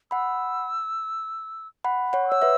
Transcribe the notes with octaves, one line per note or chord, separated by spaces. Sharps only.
F#5 B5 E6
F#5 B5
C#5 F#5
C#6
C#5 E6
B4 E5